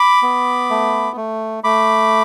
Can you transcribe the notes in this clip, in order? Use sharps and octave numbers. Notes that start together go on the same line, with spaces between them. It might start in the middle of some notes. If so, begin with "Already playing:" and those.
Already playing: B5 D6
B3
A3
A3
A3 B5 D6